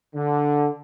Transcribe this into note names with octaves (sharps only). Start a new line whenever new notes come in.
D3